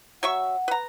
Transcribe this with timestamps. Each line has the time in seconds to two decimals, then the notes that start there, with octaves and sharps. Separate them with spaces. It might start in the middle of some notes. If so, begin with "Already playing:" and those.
0.23 F#3 E5 F#5 C#6
0.68 B4 A#5